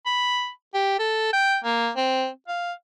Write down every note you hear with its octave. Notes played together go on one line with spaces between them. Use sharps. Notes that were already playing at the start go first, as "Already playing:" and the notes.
B5
G4
A4
G5
A#3
C4
F5